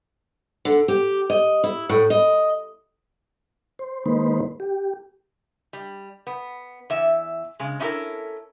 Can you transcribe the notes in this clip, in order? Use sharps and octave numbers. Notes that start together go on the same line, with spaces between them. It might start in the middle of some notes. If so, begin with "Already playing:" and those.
D3
G4
D#5
E4
A2
D#5
C5
D#3 G#3 A#3 D#4 B4 C5
G4
G3
B3
E2 E5
C#3 G#3
C#4 D#4 E4 F#4 A4 A#4